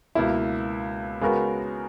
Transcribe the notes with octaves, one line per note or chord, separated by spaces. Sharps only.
C#2 B2 A#3 E4
C#3 G#3 B3 F#4 A#4